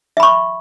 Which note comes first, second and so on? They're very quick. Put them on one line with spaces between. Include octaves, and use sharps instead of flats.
E5 B5 C#6